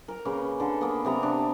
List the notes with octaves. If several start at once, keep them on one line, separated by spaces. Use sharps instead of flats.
A#4 A#5
C#3 A#3 B4
D3 A4
A#3 B3
C3 B3 A#5
D4